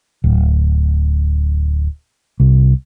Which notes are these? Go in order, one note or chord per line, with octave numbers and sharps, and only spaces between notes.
D1
C2